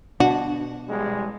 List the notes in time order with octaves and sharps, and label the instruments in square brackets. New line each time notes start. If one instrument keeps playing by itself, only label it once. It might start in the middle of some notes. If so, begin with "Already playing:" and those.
[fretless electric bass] B2 [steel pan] D4 [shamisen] F#4
[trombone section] A1 G3 G#3